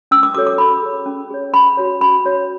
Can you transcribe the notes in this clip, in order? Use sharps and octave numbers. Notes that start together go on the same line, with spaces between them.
C#4 E6
D6
F#4 A4 C#5 D6
D6
C#4 B5
G#4 C#5
C#4
G#4 C#5
C#4 B5
F#4 C#5
C#4 B5
F#4 C#5